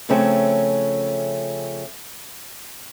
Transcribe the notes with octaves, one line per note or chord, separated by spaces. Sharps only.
C#3 F3 A3 C4 C#4